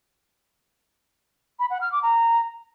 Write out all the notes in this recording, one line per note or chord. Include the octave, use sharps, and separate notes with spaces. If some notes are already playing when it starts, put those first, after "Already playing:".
B5
F#5
F6
D6
A#5